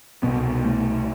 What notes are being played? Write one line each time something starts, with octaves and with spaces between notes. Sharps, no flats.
C2 B2 B3
A3